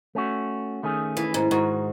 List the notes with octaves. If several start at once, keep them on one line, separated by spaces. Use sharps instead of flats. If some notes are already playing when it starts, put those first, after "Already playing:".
A3 C#4 F#4
D#3 A3 C#4 G#4
E3
G#2
G#2 D#3 G#3 D#4 F#4